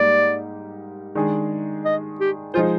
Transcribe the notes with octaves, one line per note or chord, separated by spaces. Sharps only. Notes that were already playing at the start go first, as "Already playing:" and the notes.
Already playing: G#2 G3 A#3 D#4 G4 D5
D#3 G#3 D4 G#4
D#5
G4
F3 G#3 D#4 F4 G#4 C5